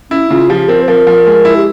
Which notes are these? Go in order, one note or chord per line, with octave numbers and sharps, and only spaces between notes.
C#4 E4
C#3 F4
F3 G4
C4 A#4
C5
F3 A#4
F3
G#3
E4
G4